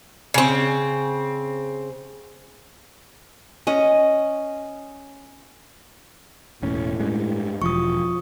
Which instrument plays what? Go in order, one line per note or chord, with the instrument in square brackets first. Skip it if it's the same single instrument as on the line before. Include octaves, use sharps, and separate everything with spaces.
[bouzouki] C#3 C4
[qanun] C#4 D#5
[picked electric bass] E1 C#4 [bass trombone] A2
[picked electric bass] G2 G#3
[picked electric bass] E1 [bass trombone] F3 [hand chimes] C#6 D#6